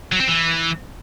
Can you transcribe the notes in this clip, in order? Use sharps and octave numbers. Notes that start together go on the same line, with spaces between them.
F#3
C4
E3